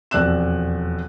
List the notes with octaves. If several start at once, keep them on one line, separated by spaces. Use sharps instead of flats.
E1 F2 D5 E6 F#6 E7